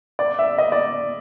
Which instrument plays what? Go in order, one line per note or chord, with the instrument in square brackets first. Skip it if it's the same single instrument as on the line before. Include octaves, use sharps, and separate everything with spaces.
[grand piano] D5
E5
D#5
D5